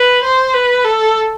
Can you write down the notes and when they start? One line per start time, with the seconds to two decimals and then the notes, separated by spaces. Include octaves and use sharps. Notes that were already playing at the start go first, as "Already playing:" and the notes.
Already playing: B4
0.23 C5
0.54 B4
0.84 A4